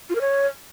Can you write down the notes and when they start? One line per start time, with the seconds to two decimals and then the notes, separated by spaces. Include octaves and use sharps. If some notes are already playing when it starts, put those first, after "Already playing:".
0.10 F4
0.15 A#4
0.21 C#5